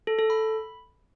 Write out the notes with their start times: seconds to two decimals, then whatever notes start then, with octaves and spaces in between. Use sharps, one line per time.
0.07 A4
0.19 A4
0.30 B5